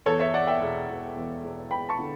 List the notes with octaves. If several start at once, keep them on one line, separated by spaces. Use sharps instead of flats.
E2 A4 C#5
C#5 E5
E2 D5 F#5
E5 G5
E1
E1
E2
E1
E1 G5 B5
A5 C#6
D3